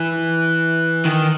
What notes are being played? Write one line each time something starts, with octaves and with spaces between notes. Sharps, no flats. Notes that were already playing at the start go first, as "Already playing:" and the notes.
Already playing: E3
D#3